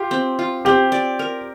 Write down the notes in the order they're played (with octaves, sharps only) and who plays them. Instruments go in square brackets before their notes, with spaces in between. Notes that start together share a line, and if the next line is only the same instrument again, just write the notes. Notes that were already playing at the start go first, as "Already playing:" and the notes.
Already playing: [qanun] F4 [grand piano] G4
[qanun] C4
F4
[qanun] C4 [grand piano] G4
[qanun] D5
A#4